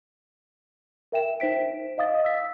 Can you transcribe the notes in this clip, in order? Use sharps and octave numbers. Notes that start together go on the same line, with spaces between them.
A#4 E5 G5 E7
D#4 C5 B6 D7
D#5 F5 D#6 A6
E6 B6